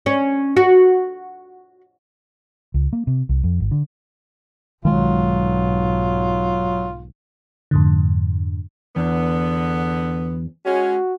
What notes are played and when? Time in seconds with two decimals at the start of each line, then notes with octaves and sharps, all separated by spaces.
0.06 C#4
0.57 F#4
2.74 C#2
2.93 A#3
3.07 C3
3.29 C2
3.44 F2
3.60 G#1
3.71 D3
4.85 B1 G#2 D#3 F#3 G#3 F4
7.71 F2 G#2 D3
8.96 E2 D3 B3
10.66 G#3 C#4 F#4